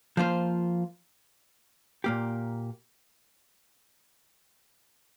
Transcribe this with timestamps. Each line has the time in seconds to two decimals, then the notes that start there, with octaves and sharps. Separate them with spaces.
0.17 F3 A#3 F4 C5
2.04 A#2 A#3 G4